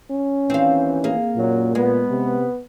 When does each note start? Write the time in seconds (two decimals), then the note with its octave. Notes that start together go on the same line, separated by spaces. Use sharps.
0.11 C#4
0.50 D#2 E3 C4 F5
1.04 A#3 G#4
1.37 F#2 A#2 F#3
1.75 G#3 B3
2.10 C3